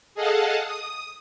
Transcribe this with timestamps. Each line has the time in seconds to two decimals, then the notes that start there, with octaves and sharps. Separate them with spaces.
0.15 G#4 A4 D#5 F5 F#5 A5
0.65 D#6